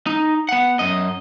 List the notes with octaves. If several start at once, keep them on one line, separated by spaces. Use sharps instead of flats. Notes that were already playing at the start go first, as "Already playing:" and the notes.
D#4
B3 F#5
F#2 D#5